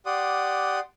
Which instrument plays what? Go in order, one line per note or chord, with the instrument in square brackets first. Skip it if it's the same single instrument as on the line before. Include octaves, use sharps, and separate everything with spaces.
[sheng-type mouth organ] G4 D5 F#5 C6 D#6